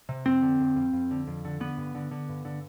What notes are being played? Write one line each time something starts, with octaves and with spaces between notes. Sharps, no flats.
C3
F2 C4
D3
F2
F2
F2
D3
F2
D3
D3 B3
G2
D3
D3
G2
D3